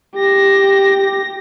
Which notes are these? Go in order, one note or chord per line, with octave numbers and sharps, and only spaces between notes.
G4 A#6